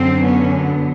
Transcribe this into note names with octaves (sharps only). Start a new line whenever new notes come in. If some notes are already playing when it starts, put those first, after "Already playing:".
Already playing: F#2 D3 F#3 C4
B3 C#4
B3